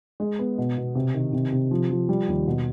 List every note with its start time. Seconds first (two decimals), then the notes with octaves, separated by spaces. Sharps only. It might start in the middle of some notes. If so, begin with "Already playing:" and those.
0.20 G#3
0.39 B3
0.58 B2
0.77 B2
0.95 C3
1.14 D#3
1.33 C3
1.52 C3
1.71 F3
1.90 F3
2.09 G3
2.28 D#2
2.47 B2